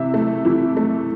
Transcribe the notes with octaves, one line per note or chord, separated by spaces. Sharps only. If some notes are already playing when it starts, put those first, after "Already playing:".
Already playing: C3 E3 E5
A3
E3
A3